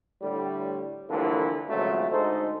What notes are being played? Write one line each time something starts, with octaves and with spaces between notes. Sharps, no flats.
A2 D3 G3
A2 D3 E3 F3 G3 A#3
G#1 C#2 C#3 F3 F#3 A3
D2 G#2 D#4 A4 C5